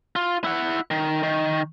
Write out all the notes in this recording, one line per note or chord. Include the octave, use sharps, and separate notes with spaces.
F4
E4 F#5
D#3
D#3